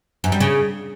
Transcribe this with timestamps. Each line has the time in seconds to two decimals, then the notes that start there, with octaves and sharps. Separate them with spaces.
0.24 F#2
0.32 G3
0.40 C#3